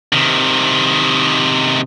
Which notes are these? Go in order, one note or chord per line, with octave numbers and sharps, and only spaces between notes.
C3 D#3